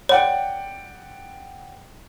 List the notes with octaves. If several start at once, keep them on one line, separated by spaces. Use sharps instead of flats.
C#5 D5 F#5 G5